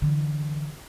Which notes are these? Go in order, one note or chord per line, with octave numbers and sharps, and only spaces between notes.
D3 E3